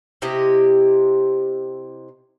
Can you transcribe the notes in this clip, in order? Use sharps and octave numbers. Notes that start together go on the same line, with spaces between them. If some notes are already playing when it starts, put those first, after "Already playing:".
C3 E4 G4 D#5